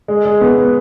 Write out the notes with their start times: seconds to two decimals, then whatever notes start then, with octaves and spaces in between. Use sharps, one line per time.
0.08 G#3
0.25 G#3
0.41 B3
0.58 B3